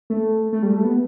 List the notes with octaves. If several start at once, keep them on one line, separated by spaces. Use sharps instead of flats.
A3
A3
G3
A3
B3